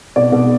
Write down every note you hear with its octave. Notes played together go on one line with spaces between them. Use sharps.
B2 D5
B2